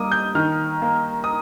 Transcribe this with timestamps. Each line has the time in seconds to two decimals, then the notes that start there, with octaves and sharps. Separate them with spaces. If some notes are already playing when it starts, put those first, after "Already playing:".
Already playing: G3 A#3 D6 D#6
0.12 G6
0.35 D#3 F6
0.82 A#3
1.24 D#6